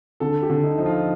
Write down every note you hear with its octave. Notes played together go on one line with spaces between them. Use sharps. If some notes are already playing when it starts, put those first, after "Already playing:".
D3 A4
G4
D3
D#4
F3 D#4
F4